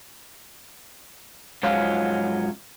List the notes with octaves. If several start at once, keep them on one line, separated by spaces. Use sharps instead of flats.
G#2 F3 F#3 C#4 F4